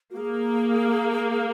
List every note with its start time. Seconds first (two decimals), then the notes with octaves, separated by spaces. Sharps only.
0.11 F#4
0.16 A#3 G#4